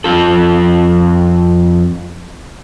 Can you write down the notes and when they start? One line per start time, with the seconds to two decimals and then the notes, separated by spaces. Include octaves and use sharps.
0.04 F2 F4 A4